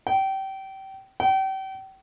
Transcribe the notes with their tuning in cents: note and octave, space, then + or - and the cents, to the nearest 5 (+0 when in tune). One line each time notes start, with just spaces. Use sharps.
G5 -25
G5 -35